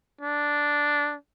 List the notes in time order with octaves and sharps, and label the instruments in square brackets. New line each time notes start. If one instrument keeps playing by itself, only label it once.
[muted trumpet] D4